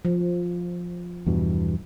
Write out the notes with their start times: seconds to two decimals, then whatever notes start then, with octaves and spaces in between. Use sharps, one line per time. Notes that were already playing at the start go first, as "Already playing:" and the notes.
0.05 F3
1.26 E2 G2 B2